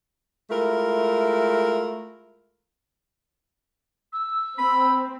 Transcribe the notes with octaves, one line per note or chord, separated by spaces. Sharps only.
G#3 A3 E4 F4 A#4
E6
C4 B5